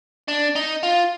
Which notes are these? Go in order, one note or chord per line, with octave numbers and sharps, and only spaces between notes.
D4
D#4
F4